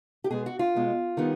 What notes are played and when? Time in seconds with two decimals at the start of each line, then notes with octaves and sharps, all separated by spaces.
0.24 G4
0.30 B2 G#3 B3 G#4
0.46 F#4
0.59 F4
0.75 B2 G#3 B3
1.17 D#3 G3 B3